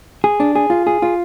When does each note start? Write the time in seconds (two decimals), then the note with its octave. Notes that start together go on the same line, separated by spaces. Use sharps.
0.24 G#4
0.40 D4
0.55 G#4
0.70 F4
0.87 G#4
1.02 F4